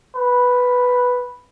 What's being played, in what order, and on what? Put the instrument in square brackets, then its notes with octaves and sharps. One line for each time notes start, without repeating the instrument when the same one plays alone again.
[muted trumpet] B4